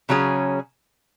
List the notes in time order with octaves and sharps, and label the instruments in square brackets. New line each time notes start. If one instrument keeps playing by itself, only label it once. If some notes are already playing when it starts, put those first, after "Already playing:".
[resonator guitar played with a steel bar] C#3 F#3 C#4 G#4